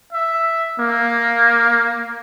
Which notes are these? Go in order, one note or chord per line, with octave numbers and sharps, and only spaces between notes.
E5
A#3